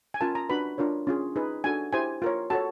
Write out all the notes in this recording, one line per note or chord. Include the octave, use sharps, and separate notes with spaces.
G#5
C#4 F4 A#4 A5
A#5
D4 F#4 B4 B5
D4 F4 A#4 C#5
C#4 F4 G#4
D#4 G#4 B4
D4 F#4 A4 G#5
E4 G4 C5 G#5
F4 A#4 C#5
F#4 A4 C#5 A5